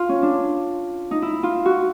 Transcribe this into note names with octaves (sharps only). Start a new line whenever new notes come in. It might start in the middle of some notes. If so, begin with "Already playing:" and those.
Already playing: F4
C#4
D4
D#4
E4
F4
F#4